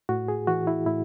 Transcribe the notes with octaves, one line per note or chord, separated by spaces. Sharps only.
A2 F#4
G#4
E3 F#4
E4
A2 E4